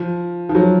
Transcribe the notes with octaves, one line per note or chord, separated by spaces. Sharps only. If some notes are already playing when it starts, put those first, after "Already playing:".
Already playing: F3
F3
F#3